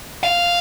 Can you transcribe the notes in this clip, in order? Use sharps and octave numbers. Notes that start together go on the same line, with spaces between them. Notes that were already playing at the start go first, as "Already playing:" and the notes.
F5